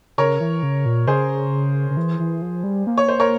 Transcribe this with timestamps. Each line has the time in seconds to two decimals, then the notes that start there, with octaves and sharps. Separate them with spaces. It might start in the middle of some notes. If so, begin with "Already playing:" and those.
0.18 C#3 A#4 C#5
0.40 E3
0.63 C#3
0.86 A#2
1.07 C#3 G#4 C5
1.90 C#3
1.97 E3
2.19 E3
2.42 F3
2.64 G3
2.87 A#3
2.98 C#5
3.09 C5
3.20 A#4 C#5